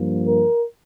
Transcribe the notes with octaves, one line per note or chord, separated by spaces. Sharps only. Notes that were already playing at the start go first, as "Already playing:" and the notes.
Already playing: G2 F3 A#3
A#4